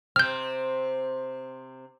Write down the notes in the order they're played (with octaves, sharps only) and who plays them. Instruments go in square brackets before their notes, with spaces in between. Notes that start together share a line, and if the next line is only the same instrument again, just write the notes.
[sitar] C3 C4 [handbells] F6 G6